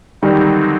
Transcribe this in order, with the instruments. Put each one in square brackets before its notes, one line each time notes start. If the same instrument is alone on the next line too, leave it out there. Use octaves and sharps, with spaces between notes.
[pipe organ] D3 F#3 C4 D#4 [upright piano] D#3 G3